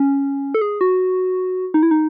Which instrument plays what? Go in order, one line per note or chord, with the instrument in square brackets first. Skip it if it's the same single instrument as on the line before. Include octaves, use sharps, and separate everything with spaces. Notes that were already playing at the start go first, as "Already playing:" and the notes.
Already playing: [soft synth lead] C#4
A4
G#4
F#4
D#4
E4
D#4